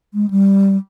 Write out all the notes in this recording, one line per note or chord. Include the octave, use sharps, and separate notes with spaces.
G#3
G3